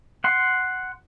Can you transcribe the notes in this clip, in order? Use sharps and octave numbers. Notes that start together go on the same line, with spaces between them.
F#5 C6